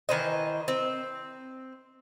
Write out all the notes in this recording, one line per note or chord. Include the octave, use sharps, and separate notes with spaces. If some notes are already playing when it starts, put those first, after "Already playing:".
D#3 E3 C5 D#5
C4